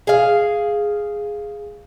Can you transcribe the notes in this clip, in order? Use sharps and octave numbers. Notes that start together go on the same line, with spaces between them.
G#4 F5